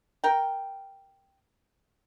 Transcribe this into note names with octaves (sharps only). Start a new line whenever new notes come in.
A#4 G5